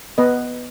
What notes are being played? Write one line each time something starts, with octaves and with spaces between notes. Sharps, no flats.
B3 B4 D#5